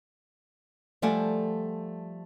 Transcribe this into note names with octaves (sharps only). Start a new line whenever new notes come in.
F3 G3 A3 D5 F#5 G#5